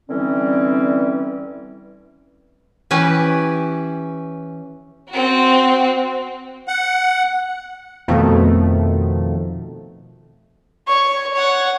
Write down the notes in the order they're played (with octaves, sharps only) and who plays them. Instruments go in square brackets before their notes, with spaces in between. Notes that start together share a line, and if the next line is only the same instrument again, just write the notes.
[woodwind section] D3 E3 G3 C4 C#4
[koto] E3 C#4 G4 B4
[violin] C4 F#4
[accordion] F#5
[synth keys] F2 B2 D#3 F3 A3
[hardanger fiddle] C#5 C#6
C#5 F#5